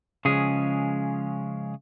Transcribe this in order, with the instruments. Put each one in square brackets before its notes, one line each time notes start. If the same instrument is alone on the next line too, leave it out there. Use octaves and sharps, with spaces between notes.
[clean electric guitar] C#3 F3 G#3 C#4 G#4